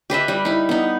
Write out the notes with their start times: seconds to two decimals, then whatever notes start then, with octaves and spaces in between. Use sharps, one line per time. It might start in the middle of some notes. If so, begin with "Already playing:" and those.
0.10 G4 B4 D#5 E5
0.28 G3
0.45 D#4 E4
0.69 B3 D#4